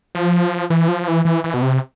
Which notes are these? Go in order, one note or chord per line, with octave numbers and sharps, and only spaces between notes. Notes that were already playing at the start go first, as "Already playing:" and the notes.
F3
E3
F3
E3
E3
E3
B2
C3